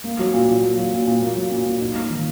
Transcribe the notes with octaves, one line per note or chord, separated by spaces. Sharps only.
A#3
F#3
A#2
A#2
A#3
F#3
A#2
A#2
A#3
F#3
A#2
A#2
D#4
A#3
D#3